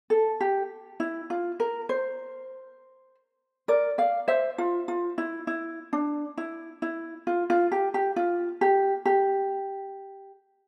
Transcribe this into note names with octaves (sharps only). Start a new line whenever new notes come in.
A4
G4
E4
F4
A#4
C5
A#4 D5
D5 F5
C5 E5
F4
F4
E4
E4
D4
E4
E4
F4
F4
G4
G4
F4
G4
G4